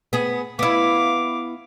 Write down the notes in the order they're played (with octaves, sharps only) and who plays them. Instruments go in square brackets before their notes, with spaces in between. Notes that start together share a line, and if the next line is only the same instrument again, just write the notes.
[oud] B3 G#4
[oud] B3 E4 [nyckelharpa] F5 D6